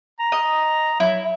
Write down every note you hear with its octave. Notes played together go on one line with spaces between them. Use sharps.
A#5
D#5
F#3 E4